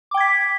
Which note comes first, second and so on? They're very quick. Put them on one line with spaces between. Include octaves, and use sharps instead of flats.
D6 G5 G#6 B6